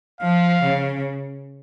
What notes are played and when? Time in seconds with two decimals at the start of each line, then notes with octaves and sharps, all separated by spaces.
0.21 F3 F5
0.63 C#3